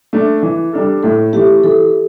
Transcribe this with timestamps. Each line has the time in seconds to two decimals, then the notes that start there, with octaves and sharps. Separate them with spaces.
0.13 A3 D4
0.43 E3
0.73 G3 D4 A4
1.03 A2 A4
1.33 E3 A3 G4
1.63 E3 A4